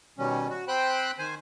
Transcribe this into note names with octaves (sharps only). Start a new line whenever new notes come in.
B2 D#3 G3 C#4
F#4
C4 C5 G5 B5 F#6
D#3 C5 G#5